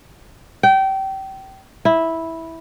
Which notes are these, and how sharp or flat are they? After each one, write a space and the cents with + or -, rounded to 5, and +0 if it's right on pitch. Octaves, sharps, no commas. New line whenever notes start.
G5 -25
E4 -10